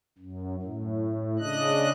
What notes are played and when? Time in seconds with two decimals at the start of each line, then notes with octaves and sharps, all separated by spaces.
0.19 F#2
0.63 A2
1.39 C#3 D4 D#5 F#6